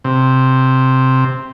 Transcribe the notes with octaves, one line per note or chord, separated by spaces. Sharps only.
C3